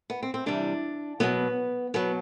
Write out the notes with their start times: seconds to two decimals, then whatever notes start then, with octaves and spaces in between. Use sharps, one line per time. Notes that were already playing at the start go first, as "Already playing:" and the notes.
0.10 B3
0.23 C4
0.34 C4
0.46 C3 E3 G3 D4
1.20 B2 F#3 B3
1.94 B2 F#3 B3